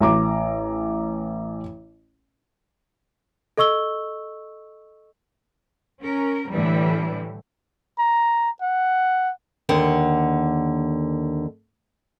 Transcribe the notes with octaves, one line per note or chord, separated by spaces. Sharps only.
A1 A#5 D6
A4 D#5 C#6 E6 G7
C#4 A#4
A2 D3 E3 G3
A#5
F#5
D#2 D3 F#5